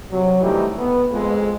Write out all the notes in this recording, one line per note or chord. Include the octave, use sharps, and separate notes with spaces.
C3 F#3
C3 E3 G3 A3 D#4 G4
B3
F2 G#3